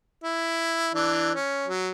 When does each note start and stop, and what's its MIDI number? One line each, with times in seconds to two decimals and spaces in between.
0.24 0.93 64
0.95 1.33 52
0.95 1.33 62
1.35 1.67 61
1.68 1.92 54